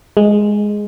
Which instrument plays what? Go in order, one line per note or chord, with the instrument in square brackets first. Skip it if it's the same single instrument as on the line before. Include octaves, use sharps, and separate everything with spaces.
[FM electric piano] G#3